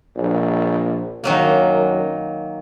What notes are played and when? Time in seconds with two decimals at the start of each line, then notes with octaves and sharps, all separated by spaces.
0.16 A#1
1.24 F#2 D#3 F#3 A#3